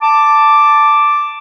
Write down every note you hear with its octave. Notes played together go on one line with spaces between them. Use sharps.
A5 D6